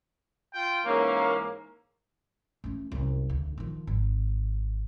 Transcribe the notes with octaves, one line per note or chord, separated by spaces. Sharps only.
F4 G5
G#2 E3 A#3 C#4
A3 C#4
C2 F#2
D2
D#3 F3
G#1